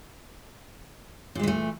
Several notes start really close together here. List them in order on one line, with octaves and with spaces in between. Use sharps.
A#2 G#3 E3 A3